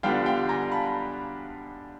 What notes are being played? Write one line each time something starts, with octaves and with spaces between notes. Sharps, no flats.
D3 G3 B3 D4 F4 F5 G5
F5 G5
G#5 A#5
A5 B5